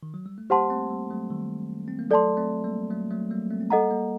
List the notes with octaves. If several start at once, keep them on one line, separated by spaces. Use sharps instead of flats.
D#3
F#3
G3
A3
G3 A#3 G4 C5 F#5 A5 C6
A3 C4
G3 A#3
F#3 A3
D#3 G3
C4
A#3
F#3 A3 A4 D5 A5 C6
A3 C4
G3 A#3
F#3 A3
F#3 A3
G3 A#3
A3 C4
C4
G3 A#3 A4 D#5 F#5 A#5
G3 A#3